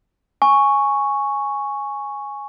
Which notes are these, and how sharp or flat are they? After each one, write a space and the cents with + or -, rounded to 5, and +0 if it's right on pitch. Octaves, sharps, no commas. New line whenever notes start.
G#5 +0 C#6 +0